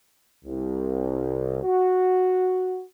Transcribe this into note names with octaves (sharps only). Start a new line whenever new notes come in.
C2
F#4